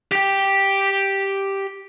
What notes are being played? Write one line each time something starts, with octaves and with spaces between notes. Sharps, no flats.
G4 G5